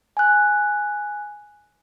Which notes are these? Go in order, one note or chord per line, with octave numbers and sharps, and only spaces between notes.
G#5 F#6